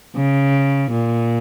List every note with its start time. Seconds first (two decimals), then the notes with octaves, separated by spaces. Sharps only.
0.16 C#3
0.91 A#2